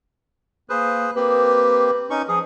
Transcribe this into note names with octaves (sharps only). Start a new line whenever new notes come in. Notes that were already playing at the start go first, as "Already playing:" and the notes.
A#3 G#4 B4 C5
A#3 C4 G4 B4
C#4 D#4 C#6
F3 G#4